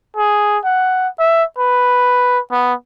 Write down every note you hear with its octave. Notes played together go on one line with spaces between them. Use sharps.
G#4
F#5
E5
B4
B3